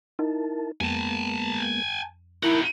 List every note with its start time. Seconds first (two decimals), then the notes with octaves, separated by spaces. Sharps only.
0.19 D#4 E4 A#4 A5
0.81 F2 G#3 A#3 B3 G#5 A5
2.43 D#4 E4 F#4 A#4 E5 A5